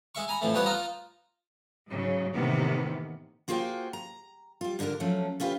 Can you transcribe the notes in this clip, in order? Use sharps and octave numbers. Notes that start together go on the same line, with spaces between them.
G#3 E5 C#6
G#5 A#5 B5
F2 A2 E3 A3
F2 G3 B3 C#5 F#5 D#6
D#4 F4 D#5 A5 A#5
G#2 C#3 F#3
A2 C3 D#3 E3 A#3 B3
A#3 F4 F#4 G#4 C5 G5
A#5
G3 F4
G#2 D3 D4 G#4 A#4
F3 F#3 A3 C#4
A3 C#4 F4 G4 B4